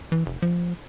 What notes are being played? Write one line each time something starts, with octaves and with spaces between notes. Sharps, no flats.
E3
F1
F3